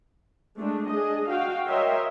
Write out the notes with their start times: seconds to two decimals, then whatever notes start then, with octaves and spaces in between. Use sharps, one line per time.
0.57 G#3 A3 D4
0.89 D4 G#4 D#5
1.30 F#4 F5 G5
1.67 A#4 C#5 D#5 E5 G5 C6